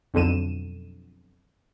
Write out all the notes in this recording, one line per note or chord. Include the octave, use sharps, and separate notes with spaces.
B1 F2 D3 D#7 E7